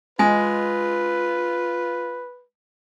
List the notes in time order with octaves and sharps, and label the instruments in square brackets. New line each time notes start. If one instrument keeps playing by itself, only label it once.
[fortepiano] G#3 [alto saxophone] F4 [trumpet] B4 [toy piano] D#5 G#5